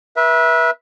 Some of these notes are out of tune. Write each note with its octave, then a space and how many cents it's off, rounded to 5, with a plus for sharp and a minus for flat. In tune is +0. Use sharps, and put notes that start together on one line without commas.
B4 -35 E5 -5